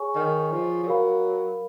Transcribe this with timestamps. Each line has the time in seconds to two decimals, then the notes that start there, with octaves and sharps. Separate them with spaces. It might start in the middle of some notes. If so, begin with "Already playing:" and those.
Already playing: G#4 C#5 G#5 C#6
0.15 D#3
0.51 F3
0.83 F3
0.87 F#3 A#4 F5 B5